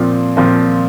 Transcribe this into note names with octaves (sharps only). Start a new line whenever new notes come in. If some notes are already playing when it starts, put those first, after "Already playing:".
Already playing: A#2 F3 C4
A#2 F3 C4